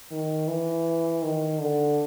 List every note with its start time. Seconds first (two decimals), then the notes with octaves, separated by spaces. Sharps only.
0.11 D#3
0.48 E3
1.23 D#3
1.60 D3